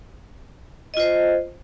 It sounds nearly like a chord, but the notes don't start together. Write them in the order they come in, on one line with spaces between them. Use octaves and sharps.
D#5 F4 C5